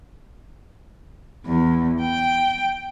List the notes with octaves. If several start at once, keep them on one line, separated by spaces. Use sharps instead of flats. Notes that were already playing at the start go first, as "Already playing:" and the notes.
E2
G5